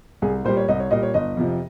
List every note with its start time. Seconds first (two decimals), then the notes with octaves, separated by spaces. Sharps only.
0.22 C2 G#4
0.44 A#2 G3 C5
0.57 C#5
0.68 C2 D#5
0.80 C#5
0.91 A#2 G3 D#5
1.03 C#5
1.14 G1 D#5
1.37 F2 C3 F3